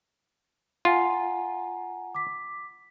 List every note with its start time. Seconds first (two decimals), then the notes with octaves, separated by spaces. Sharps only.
0.85 F4 F#5 G#5 A#5
2.15 D6 B6